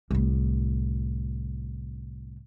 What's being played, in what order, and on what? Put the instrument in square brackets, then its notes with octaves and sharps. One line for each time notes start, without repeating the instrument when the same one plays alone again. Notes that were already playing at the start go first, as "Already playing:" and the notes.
[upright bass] C2 A2